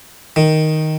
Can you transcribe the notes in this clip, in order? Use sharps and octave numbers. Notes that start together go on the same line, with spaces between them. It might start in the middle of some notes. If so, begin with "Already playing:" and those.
D#3